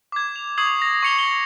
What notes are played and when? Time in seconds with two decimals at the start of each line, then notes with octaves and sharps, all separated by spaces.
0.12 D6 G#6
0.36 F7
0.58 C#6 D#6 G#6 C7 F#7
0.82 A#6
1.03 C#6 D#6 C#7 F7 G7
1.18 C#7 G7